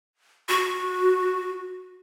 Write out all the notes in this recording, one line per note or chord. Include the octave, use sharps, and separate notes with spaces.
F#4